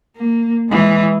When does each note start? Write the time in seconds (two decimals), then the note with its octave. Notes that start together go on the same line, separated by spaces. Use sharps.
0.17 A#3
0.69 E3 G#3